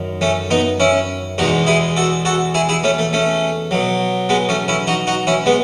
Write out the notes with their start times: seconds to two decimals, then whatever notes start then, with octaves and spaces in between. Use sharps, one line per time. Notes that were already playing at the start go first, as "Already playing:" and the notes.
Already playing: F#2 D#3
0.21 A3 C#4
0.51 B3 D#4
0.80 C#4 E4
1.38 E2 B2 G#3 D#4 F#4
1.67 E4 G#4
1.96 F#4 A4
2.25 F#4 A4
2.54 E4 G#4
2.69 E4 G#4
2.84 A3 C#4
2.98 A3
3.13 A3 C#4
3.71 B2 F#3
4.29 G#3 B3
4.49 A3 C#4
4.68 C#4 E4
4.87 D#4 F#4
5.07 D#4 F#4
5.27 C#4 E4
5.46 G#3 B3